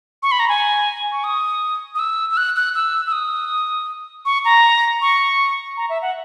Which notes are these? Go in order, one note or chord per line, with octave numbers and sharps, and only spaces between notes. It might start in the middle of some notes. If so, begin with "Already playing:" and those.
C#6
B5
A#5
G#5
C#6
D#6
D#6
E6
E6
F#6
F#6
E6
E6
D#6
C#6
A#5
C#6
A#5
E5
F#5